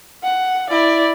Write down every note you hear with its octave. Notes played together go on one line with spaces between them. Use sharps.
F#5
E4 D5